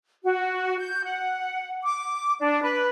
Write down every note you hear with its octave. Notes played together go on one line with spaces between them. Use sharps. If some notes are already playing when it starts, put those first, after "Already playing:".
F#4
G6
F#5
D6
D4
B4